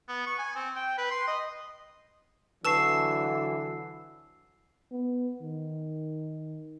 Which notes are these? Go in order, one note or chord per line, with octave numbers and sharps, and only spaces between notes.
B3
C#6
G#5
C4
G5
B4
C6
D#5
D3 E3 F#3 B4 A5 C#6 E6 C7
B3
D#3